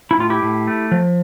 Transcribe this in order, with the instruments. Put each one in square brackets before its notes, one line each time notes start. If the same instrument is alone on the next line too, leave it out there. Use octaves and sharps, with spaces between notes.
[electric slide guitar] E4
A2 F4
E4 G4
A2
A3
F3